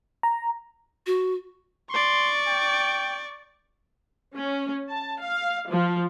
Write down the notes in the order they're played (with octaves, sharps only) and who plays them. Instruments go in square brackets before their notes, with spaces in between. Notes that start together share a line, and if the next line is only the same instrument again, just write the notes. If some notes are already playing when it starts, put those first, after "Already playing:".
[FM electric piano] A#5
[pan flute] F#4
[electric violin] D5 C#6 [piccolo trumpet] C6
[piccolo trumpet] G5
[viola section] C#4
A5
F5
F3